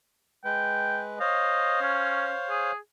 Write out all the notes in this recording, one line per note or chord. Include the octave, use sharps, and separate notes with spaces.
G#3 B4 G5
C5 C#5 D#5 F5
C#4
G#4